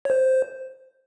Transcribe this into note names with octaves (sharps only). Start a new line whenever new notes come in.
C#5
C5